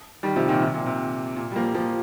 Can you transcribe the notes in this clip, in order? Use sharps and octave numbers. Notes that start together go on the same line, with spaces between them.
D#3 G3
C3 F3
A#2 D#3
C3
A#2
C3
A#2
G3
F3 A#3
F3 A#3